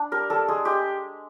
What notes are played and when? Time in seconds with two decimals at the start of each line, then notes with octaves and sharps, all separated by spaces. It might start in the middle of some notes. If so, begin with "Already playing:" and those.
Already playing: D4
0.11 G3 A#4
0.30 G3 A4
0.48 G#3 G#4
0.65 G#3 G4